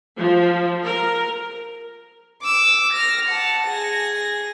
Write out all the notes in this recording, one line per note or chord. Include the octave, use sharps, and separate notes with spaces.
F3
A#4
D6 E6
F6 A#6
F#5 A5
G#4 A#6